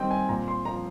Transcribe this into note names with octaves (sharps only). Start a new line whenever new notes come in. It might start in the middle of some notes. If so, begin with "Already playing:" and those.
Already playing: D#3 G3 C4 D#5 G5
G#5
A#2 A#5
C6
F3 A#5